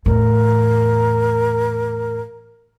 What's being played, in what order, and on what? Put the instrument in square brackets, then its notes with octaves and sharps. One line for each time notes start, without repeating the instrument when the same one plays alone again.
[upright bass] E2 A2 [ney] A#4